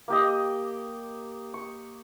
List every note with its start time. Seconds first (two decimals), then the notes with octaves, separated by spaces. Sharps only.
0.08 A#3 G4 D#5
1.54 C#6